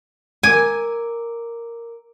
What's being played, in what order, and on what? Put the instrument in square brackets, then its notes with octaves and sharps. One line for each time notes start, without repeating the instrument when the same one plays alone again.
[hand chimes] A#4 D6 D7 [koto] G#5